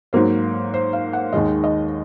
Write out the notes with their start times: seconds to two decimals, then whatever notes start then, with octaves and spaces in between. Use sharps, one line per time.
0.13 G#2 F#3 A#3 C5
0.74 C5
0.93 F5
1.13 F#5
1.33 D#2 D#3 G#3 D#5
1.64 D#5